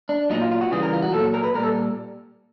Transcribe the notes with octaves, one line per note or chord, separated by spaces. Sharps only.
D4
A#2 F#3 D#4
F4
F4
F#4
C#3 E3 G3 G#4
A#4
F4
F#4
A#2 F#3 A4
A#4
B4
A#2 G3 A#4
A4